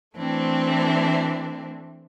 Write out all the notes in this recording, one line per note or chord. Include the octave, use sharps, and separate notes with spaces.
E3 A3 C4 D4